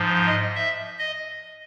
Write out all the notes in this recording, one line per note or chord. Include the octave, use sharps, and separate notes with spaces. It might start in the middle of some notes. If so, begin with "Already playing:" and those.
Already playing: G#2 F3
D#5
E5
D#5